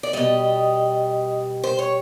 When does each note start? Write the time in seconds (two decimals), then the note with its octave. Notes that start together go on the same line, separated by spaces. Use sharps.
0.03 D5
0.13 B2 G3 D#5
1.64 C5
1.79 C#5